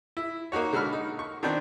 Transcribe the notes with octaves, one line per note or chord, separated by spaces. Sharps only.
E4
A#3 D#4 F#4 C#5
D3 G#3 F#4 A4 B5 F6
D#4
C#6
D#3 B3 C4 D4